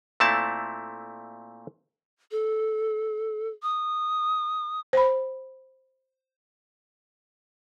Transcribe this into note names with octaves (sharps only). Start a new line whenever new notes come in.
A#2 A3 C4 E4 A5
A4
D#6
C5 B5